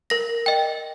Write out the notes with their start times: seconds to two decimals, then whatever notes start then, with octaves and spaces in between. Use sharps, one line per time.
0.10 A#4 A#6
0.46 D#5 G5